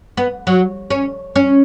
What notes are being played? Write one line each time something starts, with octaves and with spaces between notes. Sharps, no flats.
B3
F#3
C#4
C#4